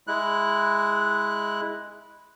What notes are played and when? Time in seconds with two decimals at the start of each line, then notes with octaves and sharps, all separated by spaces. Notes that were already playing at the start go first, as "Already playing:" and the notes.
0.07 G#3 E4 F#6